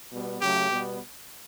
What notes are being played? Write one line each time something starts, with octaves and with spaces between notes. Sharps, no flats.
B2 G3 B3
C#3 F#3 A3 G4
B2 G3 B3